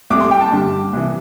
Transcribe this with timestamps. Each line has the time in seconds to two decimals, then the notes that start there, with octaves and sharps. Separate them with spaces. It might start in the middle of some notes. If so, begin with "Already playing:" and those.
0.10 C2 C3 A3 D6
0.20 C6
0.31 G5
0.41 A5
0.52 G2 D3 G3
0.93 C2 C3 E3